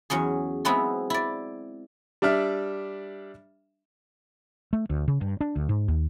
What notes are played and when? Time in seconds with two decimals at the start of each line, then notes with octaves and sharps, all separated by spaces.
0.10 E2 F#3 C#4 G#4
0.65 F#3 G#3 B3 C4 E4
1.10 E4 D5
2.22 G3 D4 E5 F6
4.73 A3
4.90 D2
5.08 C#3
5.21 G2
5.41 D4
5.56 D2
5.69 G#2
5.88 D#2